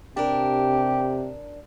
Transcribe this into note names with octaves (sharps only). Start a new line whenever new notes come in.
C3 D4 G4 A#4